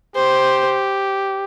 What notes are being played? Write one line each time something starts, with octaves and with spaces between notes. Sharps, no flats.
G4 C5